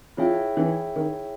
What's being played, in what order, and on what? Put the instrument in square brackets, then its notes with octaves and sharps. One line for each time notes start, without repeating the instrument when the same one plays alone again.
[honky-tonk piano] F3 [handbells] E4 G#4 C#5 E5 G5
[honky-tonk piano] E3
D#3